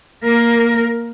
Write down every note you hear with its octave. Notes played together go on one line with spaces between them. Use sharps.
A#3 A#4